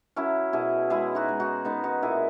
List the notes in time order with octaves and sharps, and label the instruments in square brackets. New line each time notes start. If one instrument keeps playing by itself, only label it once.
[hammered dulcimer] F#3 C#4 E4
B2 E4 G#4
G#3 E4 G#4
D#4 F#4
G#3
D#4 F#4
G#3 B3 D#4
D#4 F#4
A#2 E4 G#4